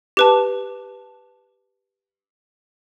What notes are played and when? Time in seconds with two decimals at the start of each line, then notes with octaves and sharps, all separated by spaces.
0.17 G4 B4 A5